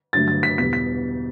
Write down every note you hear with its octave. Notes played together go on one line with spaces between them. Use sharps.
G2 D3 F#3 A3 A6
A6
B6
E2 B2 G3 B6
B6